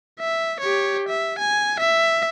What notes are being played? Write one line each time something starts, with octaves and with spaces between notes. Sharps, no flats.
E5
G4 C#5
E5
G#5
E5